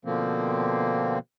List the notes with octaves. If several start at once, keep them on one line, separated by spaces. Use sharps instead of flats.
B2 D3 F3 A#3 C4